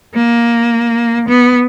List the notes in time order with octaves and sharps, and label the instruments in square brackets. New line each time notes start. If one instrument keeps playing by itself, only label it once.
[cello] A#3
B3